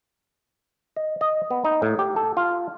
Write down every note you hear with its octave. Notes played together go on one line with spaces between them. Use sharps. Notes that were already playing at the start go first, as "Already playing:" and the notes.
D#5
D#5
B3
D#4
A2
G4
A4
F4